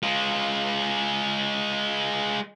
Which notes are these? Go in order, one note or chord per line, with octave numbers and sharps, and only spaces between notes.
G#3 F4